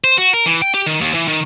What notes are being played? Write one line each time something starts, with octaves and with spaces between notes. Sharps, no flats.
C5
F#4
A#4
E3
G5
G4
D#3
D#2
E3
D#3